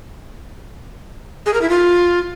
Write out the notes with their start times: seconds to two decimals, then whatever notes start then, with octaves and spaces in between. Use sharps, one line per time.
1.46 G#4
1.54 A#4
1.62 E4
1.70 F4